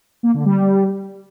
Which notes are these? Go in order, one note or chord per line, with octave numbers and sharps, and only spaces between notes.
A#3
D3
G3